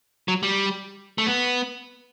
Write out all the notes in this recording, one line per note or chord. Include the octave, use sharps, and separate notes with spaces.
F#3
G3
A3
B3